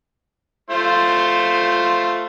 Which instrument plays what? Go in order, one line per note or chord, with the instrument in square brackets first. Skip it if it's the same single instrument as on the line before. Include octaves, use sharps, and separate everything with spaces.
[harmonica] A3 F4 C5